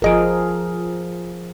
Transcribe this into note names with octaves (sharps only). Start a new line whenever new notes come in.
G1 F3 G#4 A#4 D#5 D7